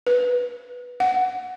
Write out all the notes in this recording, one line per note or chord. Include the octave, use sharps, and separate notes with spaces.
B4
F#5